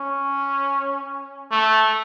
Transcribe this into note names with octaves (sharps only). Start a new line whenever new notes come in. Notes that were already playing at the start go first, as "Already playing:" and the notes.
Already playing: C#4
A3